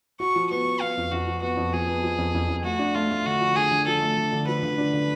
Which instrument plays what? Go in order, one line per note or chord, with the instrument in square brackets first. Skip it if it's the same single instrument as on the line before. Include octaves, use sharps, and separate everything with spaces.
[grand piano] F#4 [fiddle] C#6
[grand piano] F3
[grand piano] B3 [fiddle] C#6
[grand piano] B3
[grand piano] B3 [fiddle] F5
[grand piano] F2
[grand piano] F2 [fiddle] F#4
[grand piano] F3
[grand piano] B3 [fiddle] F#4
[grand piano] F2
[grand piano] F3 [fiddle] G#4
[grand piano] B3
F3
F2
F2
F2
[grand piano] A3 [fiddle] F#4
[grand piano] D4
[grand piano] A3 [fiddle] F4
[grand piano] A3
[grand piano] D3 [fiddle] F#4
[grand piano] F3
[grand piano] D3 [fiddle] G#4
[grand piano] D3
[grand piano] F3 [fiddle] A4
[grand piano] A3
D3
D3
[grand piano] F3 [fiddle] B4
[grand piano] D3
D4
D3